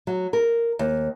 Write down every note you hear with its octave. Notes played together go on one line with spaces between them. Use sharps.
F#3
A#4
D#2